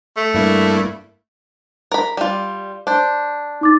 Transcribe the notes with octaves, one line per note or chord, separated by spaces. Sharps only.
A3
G2 A#3 E4
A#4 B5
G3 F4
D4 C5
D#4 D6 A6